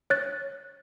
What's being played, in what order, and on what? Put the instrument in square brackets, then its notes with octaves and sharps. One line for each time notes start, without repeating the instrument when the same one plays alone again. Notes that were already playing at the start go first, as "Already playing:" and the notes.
[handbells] C#5 F#6 A6